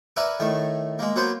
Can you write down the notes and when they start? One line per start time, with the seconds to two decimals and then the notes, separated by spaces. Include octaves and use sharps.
0.16 A#4 B4 D5 E5 F#5 G#5
0.40 A2 D#3 A3
0.99 G#3 A#3
1.16 F#3 A#3 B3 C5